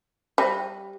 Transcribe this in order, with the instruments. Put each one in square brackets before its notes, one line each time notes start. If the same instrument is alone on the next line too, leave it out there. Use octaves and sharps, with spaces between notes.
[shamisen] G3 [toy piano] G4 C5 E5 A5